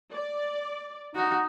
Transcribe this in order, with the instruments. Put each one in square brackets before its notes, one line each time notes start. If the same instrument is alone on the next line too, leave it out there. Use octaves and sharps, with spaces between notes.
[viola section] D5
[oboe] D#4 [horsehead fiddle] F#4